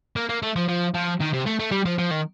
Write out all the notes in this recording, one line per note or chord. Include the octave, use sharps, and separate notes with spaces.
A#3
A#3
A3
F3
F3
F3
D#3
C3
A3
A3
G3
F3
F3
D#3